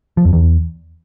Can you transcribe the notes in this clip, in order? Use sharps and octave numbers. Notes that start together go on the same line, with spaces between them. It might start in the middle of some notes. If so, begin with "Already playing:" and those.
F3
F2
E2